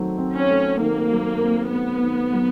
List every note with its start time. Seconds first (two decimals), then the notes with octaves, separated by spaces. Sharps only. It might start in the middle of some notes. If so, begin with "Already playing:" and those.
Already playing: D#3 F#3 A3 C4
0.18 C4
0.34 C#4
0.50 A3
0.80 D#3 A#3
1.11 F#3
1.42 C4
1.71 A3 B3
2.02 D#3
2.33 F#3